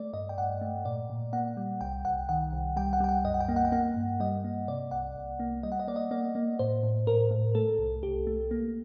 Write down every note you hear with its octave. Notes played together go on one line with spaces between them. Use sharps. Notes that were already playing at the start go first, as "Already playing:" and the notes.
Already playing: A3 D5
G2 D#5
G5
G2 F#5
A3
A#2 D5
A#2
A#3 F#5
G3
C2 G5
C2 F#5
D#3 F#5
C2
G3 G5
F#5
G3 G5
F#5
F#2 D#5
F#5
G5
A#3
F#5
G5
A#3 F#5
G2
G3 D#5
A#3
C3 D5
C2 F#5
C2
A#3
G3 D#5
F#5
D#5
A#3 D5
D#5
A#3 D5
A#3
A2 C5
A2
A2 A#4
A2
A3 A4
C2
C2 G4
A3
A#3